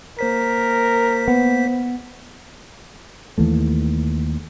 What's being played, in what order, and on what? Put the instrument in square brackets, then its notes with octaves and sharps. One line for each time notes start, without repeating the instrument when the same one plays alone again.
[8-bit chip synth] A#3 C5 B6 [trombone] A#4
[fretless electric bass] B3
D#2 E3 A3